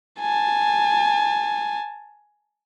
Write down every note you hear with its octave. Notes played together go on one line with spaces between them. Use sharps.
G#5 A5